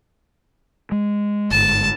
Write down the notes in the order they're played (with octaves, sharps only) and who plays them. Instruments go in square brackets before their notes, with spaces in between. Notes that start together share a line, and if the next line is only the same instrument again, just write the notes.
[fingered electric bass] G#3
[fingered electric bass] G1 G#2 [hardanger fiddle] A5